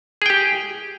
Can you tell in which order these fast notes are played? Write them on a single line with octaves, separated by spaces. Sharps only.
G#4 G5 G4